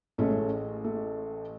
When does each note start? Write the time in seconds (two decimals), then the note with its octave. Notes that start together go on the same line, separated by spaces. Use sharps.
0.18 A1 A2 G#3 A3 C#4
0.84 A3